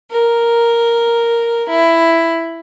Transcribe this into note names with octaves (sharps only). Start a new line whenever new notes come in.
A#4
E4